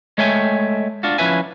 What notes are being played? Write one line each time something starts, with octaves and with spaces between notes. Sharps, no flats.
G#3 A3 C#5 E5 G5 G#5
D4 F4 F#4
F3 C#4 E4 B4 E5 G#5